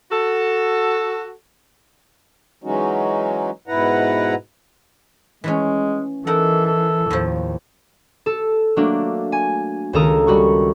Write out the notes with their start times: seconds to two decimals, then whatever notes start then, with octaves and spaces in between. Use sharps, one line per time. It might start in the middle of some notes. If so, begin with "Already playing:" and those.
0.12 F#4 A4
2.64 E3 F#3 G#3 C#4 D#4 F#4
3.68 G#2 B2 E4 B4 F#5 A#5
5.44 E3 G#3 A3 C#4
6.27 E3 D#4 A4 A#4 F#5
6.66 A4
7.10 D#2 A2 F3
8.26 A4
8.76 F#3 A3 A#3 D4
9.32 G#5
9.93 C#2 D#3 A4 A#4 A#5 D#6
10.27 G3 F#4 C#6